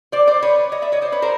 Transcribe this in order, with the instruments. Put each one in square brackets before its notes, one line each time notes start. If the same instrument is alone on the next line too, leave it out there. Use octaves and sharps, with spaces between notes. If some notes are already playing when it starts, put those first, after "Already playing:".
[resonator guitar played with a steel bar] C5 D5
C5 D5
B4 C#5
C#5 D#5
D5 E5
C#5 D#5
C5 D5
B4 C#5
A#4 C5